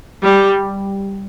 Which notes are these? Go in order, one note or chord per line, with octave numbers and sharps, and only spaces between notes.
G3